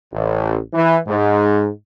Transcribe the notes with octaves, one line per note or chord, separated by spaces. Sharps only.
A1
E3
G#2